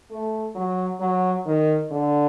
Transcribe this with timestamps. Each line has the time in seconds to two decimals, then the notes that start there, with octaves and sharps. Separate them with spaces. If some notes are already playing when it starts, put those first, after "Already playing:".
0.10 A3
0.55 F#3
1.00 F#3
1.46 D#3
1.92 D3